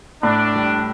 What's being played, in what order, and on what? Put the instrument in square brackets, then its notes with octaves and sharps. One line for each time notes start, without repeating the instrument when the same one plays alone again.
[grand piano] A2 [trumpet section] D4
[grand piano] G3